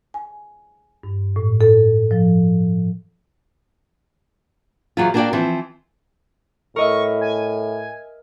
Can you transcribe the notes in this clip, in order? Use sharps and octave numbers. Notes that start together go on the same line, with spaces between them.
G#5
G2
A2
A4
F3
E2 F#3 F4
A#3 D4 F#4 G4 D5 G5
E3 F3 C4
A2 A#4 D#5 E5 C#6
G#5